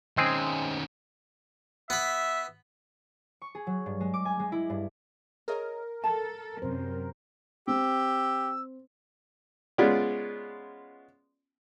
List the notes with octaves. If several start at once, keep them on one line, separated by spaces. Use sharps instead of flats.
D#3 G#3 C4 C#4 G#4
B3 E5 B5
C#6
G#4
F#3
G2
G#3
D6
G#5
G#3
E4
G2
G#4 A#4 C#5 D#5
A4 A5
F#2 C3 C4 C5
C4 G4 E6
G#3 B3 C#4 F4 D5